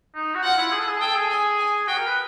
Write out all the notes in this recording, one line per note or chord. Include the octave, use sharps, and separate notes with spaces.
D#4
F#4
F4 F#5
E4
G#4
A4
G#4
A4 G5
G#4
G#5
G#5
F#4 G5
A#4
B4